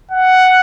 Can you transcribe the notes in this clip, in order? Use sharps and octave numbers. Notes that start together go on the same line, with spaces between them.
F#5